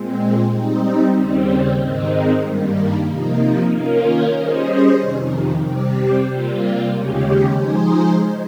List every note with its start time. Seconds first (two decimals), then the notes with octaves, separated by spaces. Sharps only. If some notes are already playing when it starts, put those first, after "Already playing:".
Already playing: A#2 G#3 C4
0.51 G3 C4 D#4
1.15 D#2 C#3 G3 C4
1.79 G#2 D#3 G#3 C4 D#4
2.44 G2 D#3 G3 A#3
3.08 C3 F3 A#3 D#4
3.71 D#3 A#3 C#4 F4 A#4
4.36 G3 C#4 G#4 C5 D#5
5.01 F2 C3 D#3
5.64 C3 G3 C4 G4
6.29 C3 G3 A#3 F4
6.92 D#2 C#3 G#3 C#4 G4
7.56 F3 G#3 D#4 G#4 C5